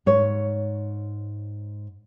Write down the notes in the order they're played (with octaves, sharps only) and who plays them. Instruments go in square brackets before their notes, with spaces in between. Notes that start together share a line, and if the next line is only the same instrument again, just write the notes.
[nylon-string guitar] G#2 C#5